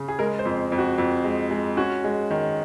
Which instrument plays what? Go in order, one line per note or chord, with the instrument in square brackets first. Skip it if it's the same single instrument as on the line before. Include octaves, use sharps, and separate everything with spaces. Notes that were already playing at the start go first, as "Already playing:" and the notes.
Already playing: [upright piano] C#3
G#4
G#3 A#4
C5
F2
F2
F#4
F2
G#3
G#3
C#4 F#4
G#3
D#3